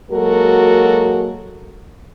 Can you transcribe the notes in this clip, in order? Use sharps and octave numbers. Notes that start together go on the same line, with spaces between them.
F#3 G#3 A#3 F#4 A4 A#4